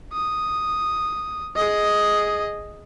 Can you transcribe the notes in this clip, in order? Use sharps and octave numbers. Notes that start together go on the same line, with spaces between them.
D#6
G#4 D#5